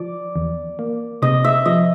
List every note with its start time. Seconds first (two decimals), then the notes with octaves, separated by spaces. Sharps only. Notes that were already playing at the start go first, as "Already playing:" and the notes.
Already playing: F3 D5
0.36 E2
0.79 A#3
1.22 C3 D#5
1.44 E5
1.66 F3 D#5